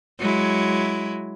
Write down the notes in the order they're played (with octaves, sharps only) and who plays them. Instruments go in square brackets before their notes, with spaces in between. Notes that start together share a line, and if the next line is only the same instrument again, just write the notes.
[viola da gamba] F#3 G#3 E4